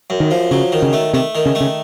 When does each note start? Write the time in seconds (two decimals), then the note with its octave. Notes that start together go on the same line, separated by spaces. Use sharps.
0.10 F#2
0.20 D#3
0.31 F3
0.51 C#3 F#3
0.72 D#3
0.82 C#3
0.93 A3
1.14 C3 A3
1.35 D#3
1.46 C#3
1.55 A3
1.61 C#3